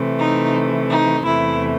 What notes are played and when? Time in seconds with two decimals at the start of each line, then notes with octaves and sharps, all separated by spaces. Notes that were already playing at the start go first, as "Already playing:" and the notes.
Already playing: C3 E3 A3
0.18 D#4
0.89 D#4
1.24 E2 C3 E3 A3 E4